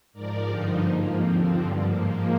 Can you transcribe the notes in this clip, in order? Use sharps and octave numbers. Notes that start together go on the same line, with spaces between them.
G#2 F3 A#4 D5
G2 D3 F3 D#4 G4
G#2 F3 A#3
D#2 D3 F3 C4
G2 D3 F3 C4
G#2 F3 A#3